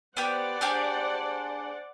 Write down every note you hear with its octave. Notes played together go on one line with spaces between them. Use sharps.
B3 G4 C5 D5 F#5
D4 G4 G#4